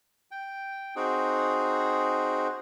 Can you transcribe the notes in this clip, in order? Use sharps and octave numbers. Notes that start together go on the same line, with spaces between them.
G5
C4 D#4 F#4 G#4